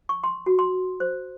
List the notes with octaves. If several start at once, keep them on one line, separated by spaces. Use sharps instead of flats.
C#6
C6
F#4
C6
C5